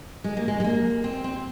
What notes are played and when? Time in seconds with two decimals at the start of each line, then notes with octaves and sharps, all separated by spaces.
0.24 G#3
0.37 A#3
0.48 G#3
0.60 G#3
0.64 A#3
1.04 C4
1.24 C4